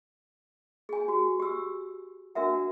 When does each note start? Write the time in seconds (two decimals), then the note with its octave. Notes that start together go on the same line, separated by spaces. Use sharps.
0.89 G#4 G#5
1.08 F#4 G4
1.40 G4 E6
2.35 D4 F#4 A#4 E5 F#5